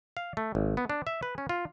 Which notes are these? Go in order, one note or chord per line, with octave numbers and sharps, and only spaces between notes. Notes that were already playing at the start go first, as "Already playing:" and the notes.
F5
A3
G#1
B3
D4
E5
B4
C#4
F4